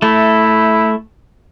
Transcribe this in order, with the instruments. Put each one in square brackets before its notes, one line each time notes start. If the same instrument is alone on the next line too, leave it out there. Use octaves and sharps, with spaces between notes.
[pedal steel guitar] A3 [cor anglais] E4